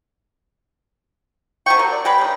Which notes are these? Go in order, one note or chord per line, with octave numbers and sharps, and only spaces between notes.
C3 C4 G5 C#6
D3 F#3 A#4
D5
G#3 G4 B4 G5
C#3 C#4 D#4